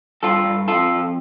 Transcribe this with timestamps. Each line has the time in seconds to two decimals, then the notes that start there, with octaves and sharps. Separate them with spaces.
0.23 G2 F4 A4
0.46 G2
0.68 F2 F4 A4
0.91 F2